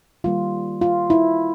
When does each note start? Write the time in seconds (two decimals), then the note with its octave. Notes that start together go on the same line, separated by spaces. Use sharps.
0.24 D#3 G3 A#3 F4
0.81 F4
1.10 E4